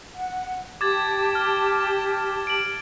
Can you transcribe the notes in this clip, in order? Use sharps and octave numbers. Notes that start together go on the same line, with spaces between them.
F#5
G4 A5 D6 G#6 A6
F6
D7 F#7